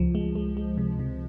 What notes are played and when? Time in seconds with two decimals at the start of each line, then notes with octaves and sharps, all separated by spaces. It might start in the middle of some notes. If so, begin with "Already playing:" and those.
Already playing: C#2 F3
0.15 G#3
0.35 G#3
0.57 G#3
0.78 C3
0.99 C3